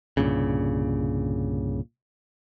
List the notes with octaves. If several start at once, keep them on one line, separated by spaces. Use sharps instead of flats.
C2 G2 A#2 C#3